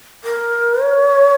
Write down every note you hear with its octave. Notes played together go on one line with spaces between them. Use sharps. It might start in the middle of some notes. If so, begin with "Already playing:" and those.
A#4
C#5